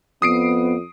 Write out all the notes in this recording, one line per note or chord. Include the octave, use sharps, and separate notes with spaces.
F2 B3 D#6 C7 D7